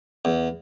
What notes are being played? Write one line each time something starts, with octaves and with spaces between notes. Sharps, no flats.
E2